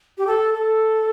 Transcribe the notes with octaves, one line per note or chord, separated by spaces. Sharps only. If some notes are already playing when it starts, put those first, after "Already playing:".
G4
A4
A4